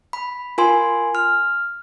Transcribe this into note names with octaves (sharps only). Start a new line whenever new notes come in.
B5
F4 A#4 G#5 C6
F6